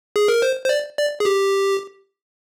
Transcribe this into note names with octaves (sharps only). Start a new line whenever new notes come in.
G#4
A#4
C5
C5
D5
D5
G#4
G4